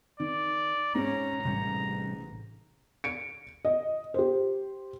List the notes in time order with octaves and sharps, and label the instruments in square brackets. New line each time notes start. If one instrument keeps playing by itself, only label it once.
[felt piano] D#3 [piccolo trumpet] D5
[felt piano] G#2 [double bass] C#4 [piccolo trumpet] A#5
[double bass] A1 [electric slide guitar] C3 G3 C#4
[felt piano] C#7 D7
D#5
G4 C5